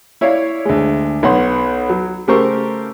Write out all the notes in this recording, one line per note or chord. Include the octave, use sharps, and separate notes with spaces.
E4 C#5 D5 F5
D2 G#3
B1 B3 C#5 F#5 C6
F#3
C#3 A3 G4 A#4 C5 C#6